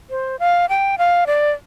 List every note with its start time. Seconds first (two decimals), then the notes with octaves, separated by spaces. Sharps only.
0.10 C5
0.40 F5
0.69 G5
0.98 F5
1.27 D5